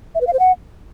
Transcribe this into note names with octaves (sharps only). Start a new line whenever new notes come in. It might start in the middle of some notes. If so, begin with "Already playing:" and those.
E5
B4
F5
C5
F#5